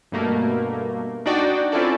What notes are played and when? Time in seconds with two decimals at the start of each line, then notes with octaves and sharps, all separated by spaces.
0.12 G2 B2 A3 A#3
1.26 D4 D#4 F#4 D5 G5
1.72 C4 C#4 E4 F4 A4 D5